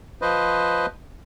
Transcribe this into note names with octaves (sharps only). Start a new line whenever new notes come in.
F3 B4 C5 D#5